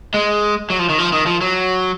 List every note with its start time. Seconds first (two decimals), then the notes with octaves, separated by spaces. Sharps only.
0.14 G#3
0.70 F#3
0.79 F3
0.89 D#3
0.99 F3
1.13 D#3
1.26 F3
1.41 F#3